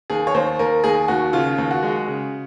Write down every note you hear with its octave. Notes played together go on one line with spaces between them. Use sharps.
D#2 G#4
C#5
D#2 C5
D#2 A#4
D#2 G#4
D#2 F#4
C#3 F4
D#2
F#4
G#3
C#3